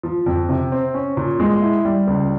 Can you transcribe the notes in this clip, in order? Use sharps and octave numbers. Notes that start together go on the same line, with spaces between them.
F3
F2
C3
C4
C#4
A#2
G#3
E4
G3
C#2